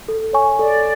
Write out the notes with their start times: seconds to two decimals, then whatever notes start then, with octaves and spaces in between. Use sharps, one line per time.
0.08 A4
0.33 C#5 G#5 C#6
0.59 A4 D5